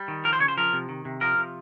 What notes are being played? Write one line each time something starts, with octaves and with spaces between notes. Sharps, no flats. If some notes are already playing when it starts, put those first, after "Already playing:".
Already playing: G3
D#3
F3 A#4
C5
C#3 C#5
C5
F3 A#4
C3
D#3
C3
F3 A#4
C3